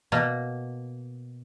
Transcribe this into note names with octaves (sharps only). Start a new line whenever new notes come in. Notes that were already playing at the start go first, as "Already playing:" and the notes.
B2 A#3